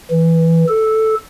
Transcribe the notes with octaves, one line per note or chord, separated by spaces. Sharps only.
E3
A4